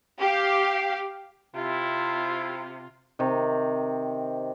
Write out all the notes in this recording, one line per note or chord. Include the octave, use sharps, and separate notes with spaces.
G4 F5
C3 E4 F4
C3 D#3